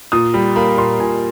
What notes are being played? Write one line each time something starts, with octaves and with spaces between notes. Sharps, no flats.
A#2 D#6
G3 B5
A#3 B5
A#2 C6
A#2 G#5